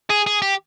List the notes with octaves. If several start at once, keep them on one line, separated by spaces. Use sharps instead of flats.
G#4
G#4
G4